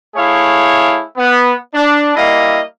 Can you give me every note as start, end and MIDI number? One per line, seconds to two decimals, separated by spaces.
0.16 1.02 57
0.16 1.02 64
0.16 1.02 68
0.16 1.02 73
0.16 1.02 77
1.17 1.53 59
1.74 2.15 62
2.16 2.61 55
2.16 2.61 58
2.16 2.61 64
2.16 2.61 75
2.16 2.61 77